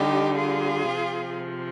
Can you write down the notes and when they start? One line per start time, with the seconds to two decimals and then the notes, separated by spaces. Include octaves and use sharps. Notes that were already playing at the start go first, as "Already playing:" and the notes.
Already playing: D3 G3 D#4 G4
0.37 F4 G#4
0.90 C3 F3